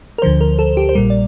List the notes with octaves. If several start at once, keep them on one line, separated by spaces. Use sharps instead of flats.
A#4
D2 D3 F3 C5
A#4
A4
G4
C5
A#1 A#2 G3 A#4
D5